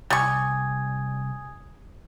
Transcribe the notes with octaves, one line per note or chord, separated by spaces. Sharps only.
C2 G3 G#5 C#6 D#6 G#6